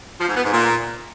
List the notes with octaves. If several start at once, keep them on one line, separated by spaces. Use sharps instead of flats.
F3
G#2
B3
G#2
A#2